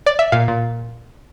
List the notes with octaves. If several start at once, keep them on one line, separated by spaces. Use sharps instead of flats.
D5
E5
A#2 F5
A#2